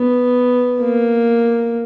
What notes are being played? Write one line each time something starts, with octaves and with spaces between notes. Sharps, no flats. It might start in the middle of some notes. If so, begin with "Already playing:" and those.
Already playing: B3
A#3